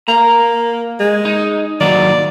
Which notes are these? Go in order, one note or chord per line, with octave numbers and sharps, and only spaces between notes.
A#3 A#5
G#3
D#4
D#3 F#3 A#3 D5